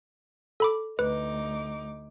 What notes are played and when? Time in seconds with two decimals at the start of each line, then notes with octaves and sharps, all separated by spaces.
0.60 A4 B5 D6
0.99 D2 D#4 B4 D6